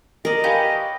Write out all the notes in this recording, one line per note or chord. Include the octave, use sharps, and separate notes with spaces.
A#4 D5 D#5
C#4 G4 B4 F5 G#5